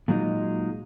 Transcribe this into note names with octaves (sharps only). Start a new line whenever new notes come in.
A#2 F#3 G#3 D#4